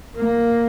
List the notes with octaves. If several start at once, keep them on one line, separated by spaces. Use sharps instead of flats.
A#3